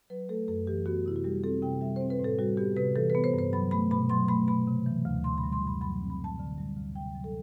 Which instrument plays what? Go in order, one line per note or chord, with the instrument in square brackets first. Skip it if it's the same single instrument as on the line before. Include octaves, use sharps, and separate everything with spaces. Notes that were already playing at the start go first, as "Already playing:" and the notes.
[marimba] F#3 B4
A3 A4
F#2 A4
E3 G4
B3 F#4
C3 E4
F#4
G3 G4
C4 A4
C3 G5
G3 E5
C4 C5
B4
A2
A4
G3 F#4
B3 G4
C3 B4
E3 A4
B3 B4
C5
G2
C5
F#3 B5
A3 B5
B2 B5
F#3 C6
A3 B5
B2 B5
C3
E3
D2
D3 C6
B5
G3
C6
F#2
B5
F#3 B5
C4
B5
A2
A5
D3
G3
D2
C3 G5
F#3
A4